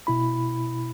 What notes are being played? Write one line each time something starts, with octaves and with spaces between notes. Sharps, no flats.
B2 E4 B5